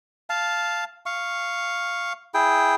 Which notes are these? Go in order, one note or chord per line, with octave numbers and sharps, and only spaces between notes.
F5 A5
F5 C#6
E4 G#4 G5